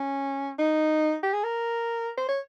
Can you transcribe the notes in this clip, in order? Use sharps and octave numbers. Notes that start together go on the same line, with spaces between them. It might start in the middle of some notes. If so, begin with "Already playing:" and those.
Already playing: C#4
D#4
G4
G#4
A#4
C5
C#5